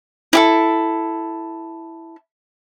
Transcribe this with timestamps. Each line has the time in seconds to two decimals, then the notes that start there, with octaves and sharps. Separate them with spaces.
0.33 E4 G4 A4